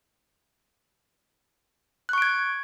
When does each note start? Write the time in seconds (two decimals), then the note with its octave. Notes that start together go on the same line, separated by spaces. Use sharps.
2.09 F#6
2.13 C#6
2.18 D7
2.22 G#6